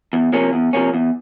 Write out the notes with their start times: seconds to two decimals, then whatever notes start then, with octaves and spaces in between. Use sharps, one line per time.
0.13 E2
0.33 C3 F3 A#3 C#4
0.53 E2
0.73 C3 F3 A#3 C#4
0.94 E2